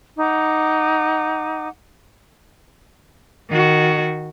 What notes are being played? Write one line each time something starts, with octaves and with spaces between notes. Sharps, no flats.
D#4 F#5 D6
D#3 F#4